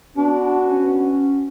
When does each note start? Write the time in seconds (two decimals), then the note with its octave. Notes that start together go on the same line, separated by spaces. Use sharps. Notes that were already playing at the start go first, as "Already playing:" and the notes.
0.17 B3 D4 F#4
0.67 C#4